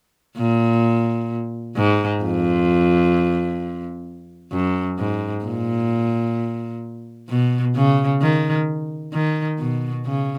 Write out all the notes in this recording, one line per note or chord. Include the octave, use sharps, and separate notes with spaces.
A#2
G#2
F2
F#2
G#2
A#2
B2
C#3
D#3
D#3
B2
C#3